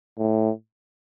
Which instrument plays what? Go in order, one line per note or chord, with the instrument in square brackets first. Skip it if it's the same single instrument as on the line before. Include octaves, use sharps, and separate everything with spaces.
[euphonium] A2